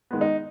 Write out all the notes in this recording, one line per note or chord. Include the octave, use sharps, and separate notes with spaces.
D#3 G#3 B3
D#4